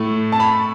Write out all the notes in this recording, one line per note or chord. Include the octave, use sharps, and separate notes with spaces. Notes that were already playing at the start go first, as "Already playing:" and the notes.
Already playing: A2 A3
A5
B5